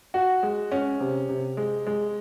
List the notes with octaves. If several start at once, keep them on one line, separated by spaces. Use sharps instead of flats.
F#4
G#3
C#4
C3
C3
G#3
G#3